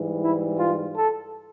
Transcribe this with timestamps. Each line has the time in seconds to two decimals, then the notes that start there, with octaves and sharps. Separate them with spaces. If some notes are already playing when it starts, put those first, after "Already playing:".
Already playing: G#2 E3 G3
0.21 E4
0.58 F4
0.95 A4